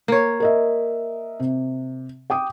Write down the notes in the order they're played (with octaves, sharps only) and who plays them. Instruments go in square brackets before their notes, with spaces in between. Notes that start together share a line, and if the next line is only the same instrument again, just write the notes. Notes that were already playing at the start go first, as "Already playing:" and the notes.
[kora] A#3 C#5
[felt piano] A#4 D#5 E5
C3
G5 D6 D#6